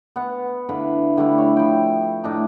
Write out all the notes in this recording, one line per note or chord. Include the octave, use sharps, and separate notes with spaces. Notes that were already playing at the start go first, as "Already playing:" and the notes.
B3 F#5
D3 E4 B4 F5
D3 G3 A3 E4
C#5
F3 G5
A2 D4 D#4